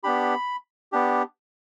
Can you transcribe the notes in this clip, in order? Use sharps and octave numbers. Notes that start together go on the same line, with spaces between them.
B3 D4 G4 B5
B3 D4 G4